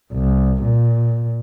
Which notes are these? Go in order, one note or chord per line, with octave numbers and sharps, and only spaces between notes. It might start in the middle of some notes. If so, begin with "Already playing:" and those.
C2
A#2